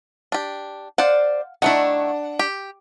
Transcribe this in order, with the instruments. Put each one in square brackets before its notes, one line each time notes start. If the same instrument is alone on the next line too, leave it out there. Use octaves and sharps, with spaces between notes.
[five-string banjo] D4 G4
[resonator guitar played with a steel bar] C5 D5 [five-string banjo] F5 F#5
[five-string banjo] D#3 A3 E4 [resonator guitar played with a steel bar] D4 F#5
[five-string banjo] G4